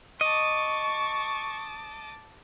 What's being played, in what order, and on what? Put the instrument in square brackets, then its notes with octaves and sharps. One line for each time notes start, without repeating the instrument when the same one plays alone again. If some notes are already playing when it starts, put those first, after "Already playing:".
[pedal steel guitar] D#5 [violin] A5 D6 [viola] C#6